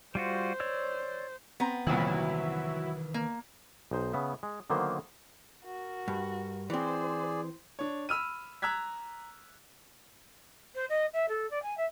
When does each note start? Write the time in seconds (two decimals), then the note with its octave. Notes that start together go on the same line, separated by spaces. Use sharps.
0.15 G3 F4 F#4 C5
0.60 C#5 D5 E6
1.60 B3 C4 A#5
1.87 C2 F2 A#2 D#3 E3 F#3 E4
3.14 A#3
3.91 B1 D#4 C5
4.13 C#3 B3 E5
4.43 G#3
4.70 D3 D#3 F#3 A#3 B3 C5
5.64 F#4 A#4
6.08 G2
6.70 E3 C4 G#4 C5 D5
7.79 D4 C#5
8.09 B5 E6 F6 D#7
8.62 A#5 E6 F#6 G#6 B6
10.75 C5
10.89 D#5
11.13 E5
11.28 A4
11.50 D5
11.63 G#5
11.77 E5